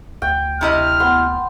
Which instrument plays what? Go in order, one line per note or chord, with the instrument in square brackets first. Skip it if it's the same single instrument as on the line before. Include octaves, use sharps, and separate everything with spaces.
[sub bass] D2 [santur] G5
[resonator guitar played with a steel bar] C3 E4 D#5 [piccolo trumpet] F6
[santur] B3 C6